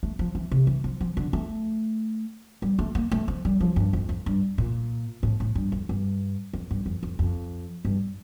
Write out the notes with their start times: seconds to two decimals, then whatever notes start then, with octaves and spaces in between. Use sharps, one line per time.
0.03 A3
0.19 F3
0.35 E3
0.52 C3
0.67 E3
0.84 F3
1.01 F3
1.17 D3
1.33 A3
2.62 G3
2.79 A3
2.95 A#3
3.12 A3
3.28 F3
3.45 G3
3.61 F3
3.76 G2
3.93 F2
4.09 F2
4.26 G2
4.58 A#2
5.23 A2
5.40 A2
5.55 G2
5.72 F2
5.89 G2
6.53 F2
6.71 G2
6.86 F2
7.03 F2
7.19 F2
7.85 G2